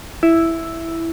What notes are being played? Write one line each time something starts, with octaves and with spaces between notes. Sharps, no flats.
E4